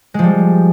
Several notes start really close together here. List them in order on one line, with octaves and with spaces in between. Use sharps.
G#3 F3 G3